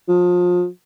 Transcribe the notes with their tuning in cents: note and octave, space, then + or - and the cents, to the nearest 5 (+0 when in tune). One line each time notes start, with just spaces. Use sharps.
F3 +30